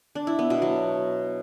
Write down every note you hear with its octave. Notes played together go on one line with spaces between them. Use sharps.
D4
E4
B3
B2
F#3